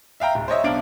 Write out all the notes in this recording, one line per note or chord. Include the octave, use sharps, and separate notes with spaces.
E5 F5 G5 A#5
D1
C5 C#5 D#5 E5
B1 D4 F5 D7